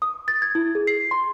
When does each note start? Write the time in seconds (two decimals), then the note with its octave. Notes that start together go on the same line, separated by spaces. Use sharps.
0.02 D#6
0.28 A6
0.42 G#6
0.55 E4
0.75 G#4
0.87 C7
1.11 C6